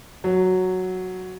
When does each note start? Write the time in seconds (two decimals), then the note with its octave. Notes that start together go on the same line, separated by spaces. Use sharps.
0.24 F#3